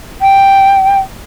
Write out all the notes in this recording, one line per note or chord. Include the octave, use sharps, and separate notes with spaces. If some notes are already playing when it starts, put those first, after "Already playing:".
G5